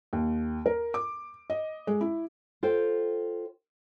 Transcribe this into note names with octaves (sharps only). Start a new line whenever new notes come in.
D#2
A#4
D6
D#5
G#3
E4
F4 A4 C5 G5